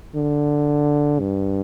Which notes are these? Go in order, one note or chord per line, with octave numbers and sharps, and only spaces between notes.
D3
G2